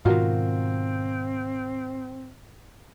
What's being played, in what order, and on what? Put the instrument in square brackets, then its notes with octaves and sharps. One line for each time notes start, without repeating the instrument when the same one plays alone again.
[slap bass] G#2 B2 D#3 [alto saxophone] C4 [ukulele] F4 F#4 A#4